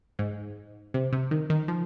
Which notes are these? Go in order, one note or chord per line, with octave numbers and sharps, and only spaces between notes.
G#2
C3
C3
D#3
D#3
F3